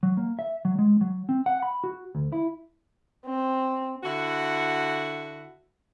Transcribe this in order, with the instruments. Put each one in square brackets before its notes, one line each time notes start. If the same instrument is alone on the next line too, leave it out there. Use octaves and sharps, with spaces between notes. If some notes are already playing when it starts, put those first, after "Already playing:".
[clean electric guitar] F#3
A#3
E5
F#3
G#3
F#3
C4
F#5
B5
F#4
D2
E4
[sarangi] C4
[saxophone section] D3 E4 F#4